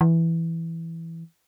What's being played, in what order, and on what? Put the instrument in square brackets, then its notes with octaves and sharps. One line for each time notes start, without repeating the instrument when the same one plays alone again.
[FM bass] E3